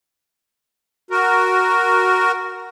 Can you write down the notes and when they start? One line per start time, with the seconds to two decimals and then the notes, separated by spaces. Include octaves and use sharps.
1.11 F#4 A#4